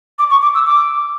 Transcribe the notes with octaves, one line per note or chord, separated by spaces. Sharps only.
D6
C#6
D6
E6
D6